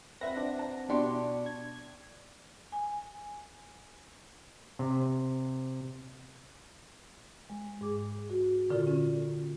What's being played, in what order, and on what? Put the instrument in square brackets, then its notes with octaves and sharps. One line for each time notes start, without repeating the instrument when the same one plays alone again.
[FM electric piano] C4 F#5 A#6 [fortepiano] B4 E5
[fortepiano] D4
A5
[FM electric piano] B2 D4 C#6 [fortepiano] E4 G4 C6
[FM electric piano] G#6
[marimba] G#5
[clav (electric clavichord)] C3
[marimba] G#3
G#2 G#4 D6
F#4
A#2 D3 F4 A4
C#4
A#3